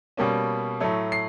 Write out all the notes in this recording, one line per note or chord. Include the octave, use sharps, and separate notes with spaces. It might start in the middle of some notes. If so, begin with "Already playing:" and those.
B2 G3 A#3 C#4
A2 F#3 A3
C7